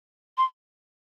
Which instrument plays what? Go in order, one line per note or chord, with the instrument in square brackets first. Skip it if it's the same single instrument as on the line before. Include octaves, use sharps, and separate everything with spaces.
[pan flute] C6